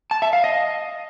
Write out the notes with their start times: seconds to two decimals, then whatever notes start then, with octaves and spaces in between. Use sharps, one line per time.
0.11 A5
0.22 E5
0.33 F5
0.44 D#5